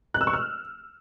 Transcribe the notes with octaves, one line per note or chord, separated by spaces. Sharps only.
F#6
E6
C#6
F6